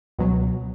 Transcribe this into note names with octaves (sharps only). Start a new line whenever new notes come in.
C#2 B2 F#3